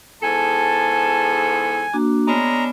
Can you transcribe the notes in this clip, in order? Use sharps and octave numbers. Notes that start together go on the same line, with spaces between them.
E2 G#2 A4 G#5 A5
A#3 D4 F#4
G#3 B3 C#4 D4 A#5